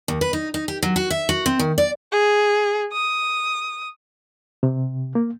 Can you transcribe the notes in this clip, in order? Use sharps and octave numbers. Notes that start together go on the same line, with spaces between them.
D#2
B4
D#4
D#4
G4
F#3
F#4
E5
F#4
C4
D#3
D5
G#4
D#6
C3
A#3